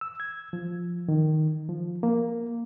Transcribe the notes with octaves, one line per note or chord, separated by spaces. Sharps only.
E6
G#6
F3
D#3
F3
A#3